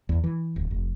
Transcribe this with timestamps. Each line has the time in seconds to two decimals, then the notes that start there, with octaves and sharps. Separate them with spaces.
0.09 E2
0.24 E3
0.56 D1
0.71 F1